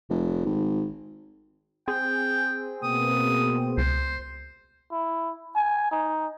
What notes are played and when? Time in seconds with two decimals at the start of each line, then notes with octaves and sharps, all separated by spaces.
0.10 F1
0.45 G#1
1.88 C4 G#4 G5
2.83 B2 A#3 B3 D#6
3.78 C#2 C5
4.92 E4
5.55 G#5
5.91 D#4